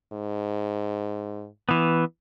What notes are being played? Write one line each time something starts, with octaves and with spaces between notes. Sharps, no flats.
G#2
E3 B3